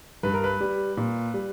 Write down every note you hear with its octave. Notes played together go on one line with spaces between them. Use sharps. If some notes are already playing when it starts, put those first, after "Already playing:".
G2 B4
A#4
B4
G3
A#2
G3